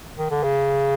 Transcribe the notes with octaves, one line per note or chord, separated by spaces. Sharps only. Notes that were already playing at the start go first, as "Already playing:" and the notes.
D#3
D3
C#3